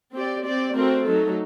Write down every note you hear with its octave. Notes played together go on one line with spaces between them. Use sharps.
C4 G4 D5
C4 G4 D5
A3 C4 F#4 A#4
F#3 A3 D#4 A4